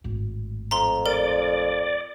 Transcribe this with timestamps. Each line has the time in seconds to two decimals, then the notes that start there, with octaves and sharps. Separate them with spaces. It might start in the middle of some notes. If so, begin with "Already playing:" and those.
0.04 G#1 A2
0.71 F2 A#5 C6
1.06 A#4 D5